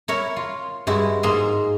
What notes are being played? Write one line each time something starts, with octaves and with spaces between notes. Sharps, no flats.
E4 A#4 C#5
F4
G2 G#3 E4 F#4
G#2 A#3 G#4 D#5 C6